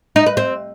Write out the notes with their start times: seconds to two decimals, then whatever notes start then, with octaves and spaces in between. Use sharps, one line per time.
0.16 D#4
0.26 B4
0.37 C4